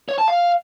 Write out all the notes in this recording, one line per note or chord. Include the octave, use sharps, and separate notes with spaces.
C#5
A5
F5